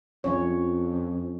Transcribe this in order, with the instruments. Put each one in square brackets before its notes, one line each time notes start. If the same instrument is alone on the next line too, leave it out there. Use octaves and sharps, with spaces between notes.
[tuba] F2 [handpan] F3 C#4 C#5